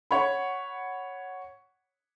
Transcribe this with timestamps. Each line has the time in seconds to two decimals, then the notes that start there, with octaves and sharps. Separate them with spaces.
0.11 C#5 F#5 B5